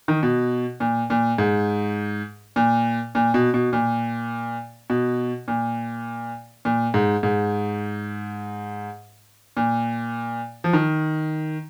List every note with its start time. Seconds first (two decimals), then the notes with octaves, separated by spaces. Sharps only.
0.08 D#3
0.23 B2
0.80 A#2
1.10 A#2
1.38 G#2
2.56 A#2
3.15 A#2
3.34 B2
3.54 B2
3.73 A#2
4.90 B2
5.48 A#2
6.65 A#2
6.94 G#2
7.23 G#2
9.57 A#2
10.64 F3
10.73 D#3